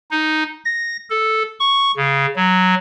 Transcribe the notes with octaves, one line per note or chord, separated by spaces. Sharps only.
D#4
A#6
A4
C#6
C#3
F#3